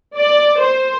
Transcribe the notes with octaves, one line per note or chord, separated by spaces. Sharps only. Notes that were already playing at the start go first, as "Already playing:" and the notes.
D5
C5